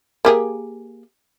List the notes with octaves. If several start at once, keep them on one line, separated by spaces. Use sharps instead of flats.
A#3 G4 G#4